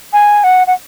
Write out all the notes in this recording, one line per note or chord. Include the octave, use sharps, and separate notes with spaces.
G#5
F#5
F#5